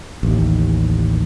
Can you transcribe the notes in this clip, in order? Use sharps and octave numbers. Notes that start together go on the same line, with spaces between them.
A1 D#2